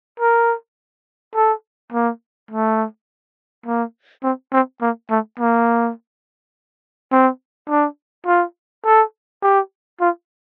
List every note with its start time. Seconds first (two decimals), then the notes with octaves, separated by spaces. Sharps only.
0.20 A#4
1.35 A4
1.93 A#3
2.51 A3
3.66 A#3
4.23 C4
4.52 C4
4.82 A#3
5.10 A3
5.40 A#3
7.12 C4
7.69 D4
8.27 F4
8.85 A4
9.42 G4
10.01 F4